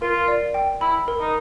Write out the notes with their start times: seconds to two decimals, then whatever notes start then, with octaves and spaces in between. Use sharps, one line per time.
0.02 F4 A#4
0.28 D5
0.54 G5
0.81 E4 B5
1.08 A#4
1.21 D#4